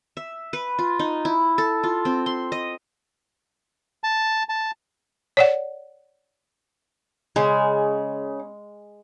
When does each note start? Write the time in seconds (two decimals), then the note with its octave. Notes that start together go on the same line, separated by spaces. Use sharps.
0.17 E5
0.53 B4
0.79 F4
0.99 D#4
1.25 E4
1.58 A4
1.83 F4
2.05 C4
2.26 C6
2.52 D#5
4.04 A5
4.49 A5
5.37 C#5 D5 F#5
7.36 C#3 G#3